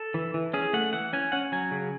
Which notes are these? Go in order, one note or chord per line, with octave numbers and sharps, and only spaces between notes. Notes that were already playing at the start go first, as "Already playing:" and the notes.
Already playing: A4
E3
E3
C#4 G#4
A3 F#5
E3 F#5
C#4 G#5
C#4 F#5
F#3 G#5
C#3